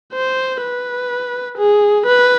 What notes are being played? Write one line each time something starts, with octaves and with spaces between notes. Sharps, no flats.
C5
B4
G#4
B4